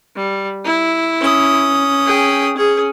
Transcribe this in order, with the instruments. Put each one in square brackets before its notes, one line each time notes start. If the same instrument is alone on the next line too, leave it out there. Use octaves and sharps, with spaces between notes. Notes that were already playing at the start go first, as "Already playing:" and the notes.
[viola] G3
E4
[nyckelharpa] C#4 D#6
[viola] G#4 G5
[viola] C#4 [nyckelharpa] G#4